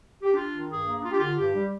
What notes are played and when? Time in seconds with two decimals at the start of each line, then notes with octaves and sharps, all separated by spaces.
0.23 G4
0.34 D4 F4
0.52 D#3
0.69 G2 G#4
0.85 A#3
1.02 D4 F4
1.10 G4
1.17 D3 F4
1.37 G2 G4
1.54 G3